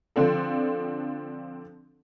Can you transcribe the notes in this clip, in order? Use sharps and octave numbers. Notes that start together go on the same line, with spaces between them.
D3 F3 C4 D4 A4